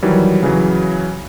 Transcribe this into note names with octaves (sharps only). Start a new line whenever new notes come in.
D#3 E3 F#3 G3
C#3 E3 F#3